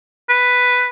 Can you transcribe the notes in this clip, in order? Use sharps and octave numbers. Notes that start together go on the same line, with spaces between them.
B4